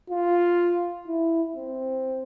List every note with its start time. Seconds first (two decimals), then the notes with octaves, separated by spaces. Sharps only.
0.10 F4
1.08 E4
1.56 C4